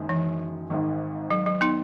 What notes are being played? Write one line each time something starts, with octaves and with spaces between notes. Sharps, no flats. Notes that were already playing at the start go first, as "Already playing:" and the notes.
Already playing: F#1 F#2 D#3 G#3
E3
G#1 G#2 D#3
F#3
F#3
B3 D#4